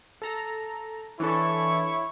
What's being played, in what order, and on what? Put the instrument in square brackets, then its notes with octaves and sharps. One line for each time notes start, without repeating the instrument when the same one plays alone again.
[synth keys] A4 A#5
[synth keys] E3 D4 A4 [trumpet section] E4 C#5 C#6